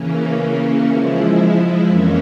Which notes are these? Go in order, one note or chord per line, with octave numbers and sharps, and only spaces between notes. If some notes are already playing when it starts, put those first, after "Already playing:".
Already playing: C#3 E3 A#3 C#4
F3 G#3 E4
F2 E3 A#3 C#4